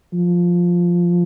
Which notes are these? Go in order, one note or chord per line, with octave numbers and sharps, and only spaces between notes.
F3